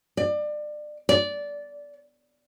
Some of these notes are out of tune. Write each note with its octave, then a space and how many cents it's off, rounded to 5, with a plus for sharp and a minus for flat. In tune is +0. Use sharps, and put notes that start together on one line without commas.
D5 +30
D5 -15